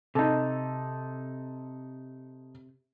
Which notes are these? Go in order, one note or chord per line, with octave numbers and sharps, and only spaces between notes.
C3 D#4 A4